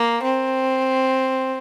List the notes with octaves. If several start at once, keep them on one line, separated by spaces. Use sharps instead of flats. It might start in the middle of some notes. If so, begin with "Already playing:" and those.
Already playing: A#3
C4